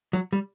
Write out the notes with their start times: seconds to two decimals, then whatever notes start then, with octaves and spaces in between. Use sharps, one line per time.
0.13 F#3
0.33 G3